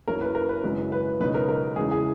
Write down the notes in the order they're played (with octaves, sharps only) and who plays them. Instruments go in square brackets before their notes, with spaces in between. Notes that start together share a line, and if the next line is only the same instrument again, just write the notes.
[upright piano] F#2 E3 A#3 C#4 [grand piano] A#4
[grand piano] B4
A#4
B4
[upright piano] G#1 F#2 C#3 E3 G#3
[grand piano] B4
[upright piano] C#2 B2 F#3 B3 D#4 [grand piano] B4
[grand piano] A#4
A#4
[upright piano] E2 C#3 E3 G#3 [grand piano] G#4
[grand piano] G#4